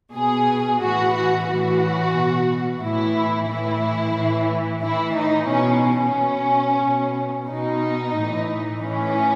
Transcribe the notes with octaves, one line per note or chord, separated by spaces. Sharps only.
B2 G#4
A2 E3 F#4
F#4
A2 E3 F#4
B2
A2 E3 E4
A2 E3 E4
A2 E3
A2 E3 E4
D#4
B2 C#4
C#4
B2
B2
B2 D#4
A2 E3
A2 E3 C#4